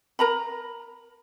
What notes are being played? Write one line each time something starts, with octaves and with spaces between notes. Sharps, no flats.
A#4 A#5 B5